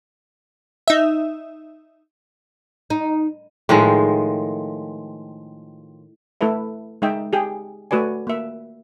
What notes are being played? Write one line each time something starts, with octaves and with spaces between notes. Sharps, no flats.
D#4 E5
D#4
A2 D#3 F3 G#3
A3 E4 A4 B4 E5
G#3 D#4 D#5 E5 G5
G4 G#4 G5
A3 F#4 B4 D5 G#5
A#3 E5